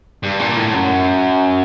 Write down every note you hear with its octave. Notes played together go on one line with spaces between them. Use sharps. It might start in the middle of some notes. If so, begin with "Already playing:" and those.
G2
A#2
A2
F#2